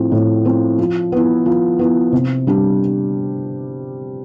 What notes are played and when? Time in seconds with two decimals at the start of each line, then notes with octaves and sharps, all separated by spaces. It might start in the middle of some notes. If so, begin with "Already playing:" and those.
Already playing: A2 F3 C4
0.12 A2
0.45 F3 C4
0.78 F3
1.12 B3 E4
1.46 F3
1.79 B3 E4
2.12 C3
2.47 G3 D4 G4